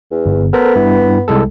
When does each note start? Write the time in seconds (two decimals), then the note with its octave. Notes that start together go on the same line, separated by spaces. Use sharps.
0.11 E2
0.26 G1
0.53 B3 A4 A#4 C5
0.76 G2 E4
1.28 C2 G#3 A4